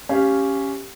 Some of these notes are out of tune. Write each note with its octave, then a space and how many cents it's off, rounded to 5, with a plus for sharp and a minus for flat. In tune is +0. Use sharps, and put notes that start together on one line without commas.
C#4 +0 G4 +0 F5 -5